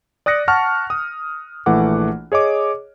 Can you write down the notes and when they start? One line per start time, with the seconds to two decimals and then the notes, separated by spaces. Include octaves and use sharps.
0.26 D5 D#6 F#6 A#6 C#7
0.48 F#5 A5 C#6 F6
0.90 D#6
1.66 A#1 E3 A3 F#5 D6
2.32 G#4 C#5 D#5 D6